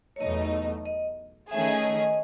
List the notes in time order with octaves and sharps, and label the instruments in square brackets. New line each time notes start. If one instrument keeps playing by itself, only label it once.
[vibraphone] C#5
[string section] E2 B2 F#3 A3 D#4 [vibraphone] D#5
[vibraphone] D#5
[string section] D#3 A3 C#4 G#4 [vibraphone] E5
[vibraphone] D#5
D#5
D#5